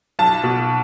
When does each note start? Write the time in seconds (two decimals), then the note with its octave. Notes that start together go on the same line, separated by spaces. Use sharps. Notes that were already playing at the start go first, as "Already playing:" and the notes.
0.19 B1 A5
0.44 B2